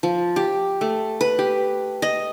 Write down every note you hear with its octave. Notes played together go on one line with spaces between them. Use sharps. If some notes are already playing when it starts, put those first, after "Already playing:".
F3
G4
A3
B4
G4
D#5